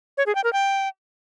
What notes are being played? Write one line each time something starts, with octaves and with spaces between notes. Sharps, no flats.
C#5
G#4
G5
A#4
G5